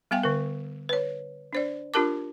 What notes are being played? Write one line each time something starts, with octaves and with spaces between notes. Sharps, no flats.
G3 B3 F5 G5 G#5
D3 A#4
B4 C#5
D4 C5 D5
D4 F4 G4 A#4 A5 D6